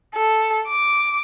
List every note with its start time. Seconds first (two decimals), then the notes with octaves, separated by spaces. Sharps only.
0.15 A4
0.68 D6